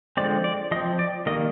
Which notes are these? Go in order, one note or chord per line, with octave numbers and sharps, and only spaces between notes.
D3 F3 G#3 C4 D5
D5
F3 C4 D#5
D5
D#3 G3 A#3 D#5